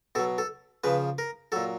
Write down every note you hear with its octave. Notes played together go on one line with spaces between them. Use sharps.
B2 F#3 A4
A4
C#3 F3 B4
A#4
A#2 F#3 A4